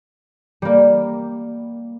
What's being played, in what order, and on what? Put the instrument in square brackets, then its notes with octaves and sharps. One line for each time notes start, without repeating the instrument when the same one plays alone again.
[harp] G3 A#3